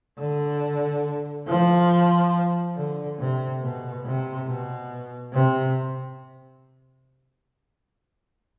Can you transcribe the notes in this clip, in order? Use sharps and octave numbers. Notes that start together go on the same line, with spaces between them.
D3
F3
D3
C3
B2
C3
B2
C3